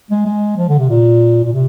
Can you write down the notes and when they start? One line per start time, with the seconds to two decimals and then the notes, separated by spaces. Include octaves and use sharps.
0.11 G#3
0.26 G#3
0.57 F3
0.69 D3
0.79 C3
0.89 A#2
1.44 A#2
1.53 C3